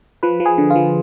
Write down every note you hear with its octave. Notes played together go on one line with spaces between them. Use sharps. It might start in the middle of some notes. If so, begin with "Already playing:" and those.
F3 B4
F3
G#4
D3
F4
F3